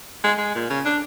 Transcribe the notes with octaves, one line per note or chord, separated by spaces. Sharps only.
G#3
G#3
A#2
C#3
D4